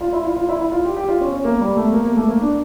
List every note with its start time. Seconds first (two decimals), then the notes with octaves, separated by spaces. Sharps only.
0.01 F4
0.12 E4
0.25 F4
0.36 F4
0.49 E4
0.60 E4
0.72 F4
0.85 G4
0.96 G4
1.09 F4
1.21 C#4
1.32 C#4
1.44 A#3
1.60 G3
1.77 A3
1.92 A#3
2.05 A#3
2.16 A3
2.29 A#3
2.41 D4